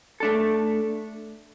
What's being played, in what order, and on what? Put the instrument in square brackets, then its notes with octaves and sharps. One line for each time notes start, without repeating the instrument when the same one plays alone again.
[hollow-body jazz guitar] A3 D4 A4